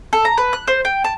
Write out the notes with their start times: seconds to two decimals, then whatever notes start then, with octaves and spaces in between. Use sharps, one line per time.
0.13 A4
0.25 A#5
0.38 B4
0.53 F#6
0.68 C5
0.85 G5
1.04 A5